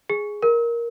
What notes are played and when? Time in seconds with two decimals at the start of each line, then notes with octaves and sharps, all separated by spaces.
0.10 G#4
0.43 A#4